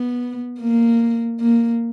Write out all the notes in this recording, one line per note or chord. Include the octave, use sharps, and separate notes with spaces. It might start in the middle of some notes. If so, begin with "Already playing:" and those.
Already playing: B3
A#3
A#3